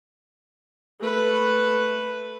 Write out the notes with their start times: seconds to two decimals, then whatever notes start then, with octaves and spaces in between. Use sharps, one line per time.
1.00 A3 B4